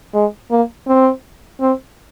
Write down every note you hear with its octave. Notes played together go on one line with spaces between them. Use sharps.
G#3
A#3
C4
C4